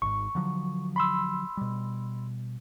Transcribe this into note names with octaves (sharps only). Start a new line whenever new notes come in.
G#1 G#2 C#6
D3 F3 F#3
B5 C6 E6
B2 G3